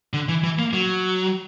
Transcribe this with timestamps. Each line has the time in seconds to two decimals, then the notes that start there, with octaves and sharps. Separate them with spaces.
0.13 D3
0.29 E3
0.44 E3
0.59 A#3
0.73 F#3